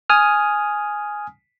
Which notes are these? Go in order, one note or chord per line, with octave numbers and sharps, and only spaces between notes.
G#5 D#6 F6